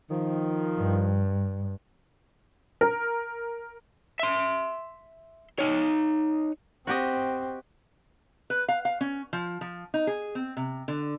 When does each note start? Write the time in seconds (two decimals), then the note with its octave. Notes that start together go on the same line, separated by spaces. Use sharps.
0.10 D#3 F3
0.78 G2
2.81 A#4
4.19 E5 C6
5.59 D#4 C#5
6.87 C4 F#4 G4 D#5
8.50 B4
8.68 F5
8.85 F5
9.01 C#4
9.33 F3
9.61 F3
9.94 D#4
10.07 G#4
10.35 C4
10.57 C3
10.88 D3